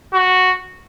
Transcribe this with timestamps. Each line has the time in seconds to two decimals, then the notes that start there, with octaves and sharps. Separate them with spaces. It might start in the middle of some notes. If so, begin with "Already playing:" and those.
0.14 F#4